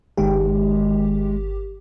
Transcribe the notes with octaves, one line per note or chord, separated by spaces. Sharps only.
G1 D#3 G#3 G4